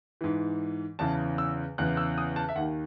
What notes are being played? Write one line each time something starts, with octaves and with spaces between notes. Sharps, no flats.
G#2 E3
E2 C#3 E3 A5
E6
E2 C#3 E3 F#6
E6
D#6
A5
E5
D#2 D#3 F#5